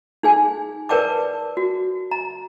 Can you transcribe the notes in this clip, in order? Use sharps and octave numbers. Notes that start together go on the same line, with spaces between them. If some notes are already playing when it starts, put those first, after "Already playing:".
D#4 G#4 G#5
A#4 B4 D5 G5 A5 D6
F#4
A#5